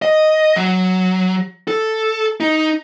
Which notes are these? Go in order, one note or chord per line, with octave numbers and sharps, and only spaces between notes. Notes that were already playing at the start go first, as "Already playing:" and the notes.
D#5
F#3
A4
D#4